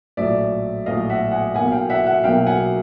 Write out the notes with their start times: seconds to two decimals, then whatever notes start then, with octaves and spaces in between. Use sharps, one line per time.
0.17 A#1 A2 F#3 D5 E5
0.86 A#1 A2 F#3 D#5 F5
1.10 E5 F#5
1.31 F#5 G#5
1.54 B1 B2 F#3 A#3 F#5 G#5
1.72 F5 G5
1.90 E5 F#5
2.06 E5 F#5
2.23 B1 B2 F#3 A#3 F5 G5
2.47 F#5 G#5